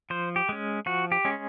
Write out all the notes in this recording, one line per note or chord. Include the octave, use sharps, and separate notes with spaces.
F3 C5
G4
G#3 C#4
F3 F#4
G4
G#3 C#4